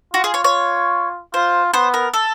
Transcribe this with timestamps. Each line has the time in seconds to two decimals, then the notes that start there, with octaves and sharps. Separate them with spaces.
0.14 F4 F#4
0.24 G#4
0.34 C#5
0.44 C#5
1.34 F4 C5
1.74 B3 C5
1.94 A#4
2.14 A4